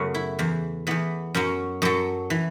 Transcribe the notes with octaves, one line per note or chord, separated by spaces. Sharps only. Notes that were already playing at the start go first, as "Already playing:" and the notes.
Already playing: F#2 C#3 F#3 A3 B3 F#4
E4
E2 E3
E2 E3 B3
F#2 F#3 C#4
F#2 F#3 A4
E3